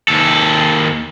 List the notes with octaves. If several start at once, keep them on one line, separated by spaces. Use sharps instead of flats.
D#2 A4